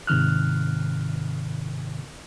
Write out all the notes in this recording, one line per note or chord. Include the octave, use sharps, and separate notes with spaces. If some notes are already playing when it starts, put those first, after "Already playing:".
G#2 C3 D#3 F6 F#6